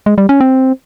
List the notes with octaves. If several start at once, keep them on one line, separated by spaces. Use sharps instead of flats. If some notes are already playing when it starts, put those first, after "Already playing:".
G#3
G3
C#4
C4